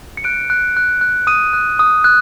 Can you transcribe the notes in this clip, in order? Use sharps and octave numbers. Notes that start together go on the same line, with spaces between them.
C#7
F#6 D7
F#6
F#6
F#6
D#6 D#7
F#6
D#6
F#6